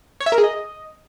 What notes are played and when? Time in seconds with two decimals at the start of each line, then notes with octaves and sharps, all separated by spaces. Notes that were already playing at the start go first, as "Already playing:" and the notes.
0.20 C#5
0.26 E5
0.32 A#4
0.38 G#4
0.44 D#5